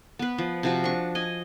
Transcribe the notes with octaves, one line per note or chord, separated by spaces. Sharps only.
B3 B4
F3
C3 F3 F#4
D4 C#6
D#5 G#5